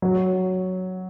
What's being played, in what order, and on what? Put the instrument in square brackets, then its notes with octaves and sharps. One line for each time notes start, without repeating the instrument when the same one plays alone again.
[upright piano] F#3